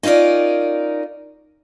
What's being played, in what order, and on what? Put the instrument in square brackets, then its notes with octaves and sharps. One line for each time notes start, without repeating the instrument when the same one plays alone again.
[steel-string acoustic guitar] C#4 D#4 F4 A#4 D5